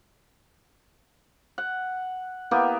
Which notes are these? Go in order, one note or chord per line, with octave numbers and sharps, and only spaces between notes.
F#5
A#3 B3 E4 G4